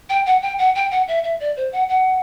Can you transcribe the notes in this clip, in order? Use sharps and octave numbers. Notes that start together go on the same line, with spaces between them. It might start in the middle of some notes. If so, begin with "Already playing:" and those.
G5
F#5
G5
F#5
G5
F#5
E5
E5
D5
C5
F#5
F#5